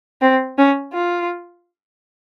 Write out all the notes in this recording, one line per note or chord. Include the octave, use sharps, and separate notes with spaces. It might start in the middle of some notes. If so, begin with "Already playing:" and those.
C4
C#4
F4